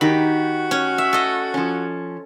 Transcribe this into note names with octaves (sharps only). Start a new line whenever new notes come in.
D#3 D#4 F#4 G4 B5
C#4
E5
A4 D#5
F3 C#4